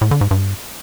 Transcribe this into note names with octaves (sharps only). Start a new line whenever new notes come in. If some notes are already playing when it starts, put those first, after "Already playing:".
A2
D3
G#2
G2